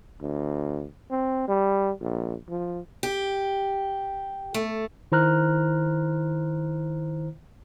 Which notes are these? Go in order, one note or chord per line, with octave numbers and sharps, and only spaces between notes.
D2
C4
G3
A#1
F3
G4
A3
D#3 E4 C5 A#5 F6 F#6